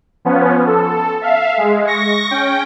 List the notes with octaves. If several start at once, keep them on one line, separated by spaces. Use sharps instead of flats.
F3 B3 C#4
A4
E5 F5
G#3
C#6 A#6
C#4 G5